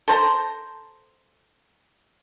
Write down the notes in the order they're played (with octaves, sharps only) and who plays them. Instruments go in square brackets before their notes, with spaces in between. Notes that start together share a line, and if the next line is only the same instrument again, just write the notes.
[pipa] A4 C5 A#5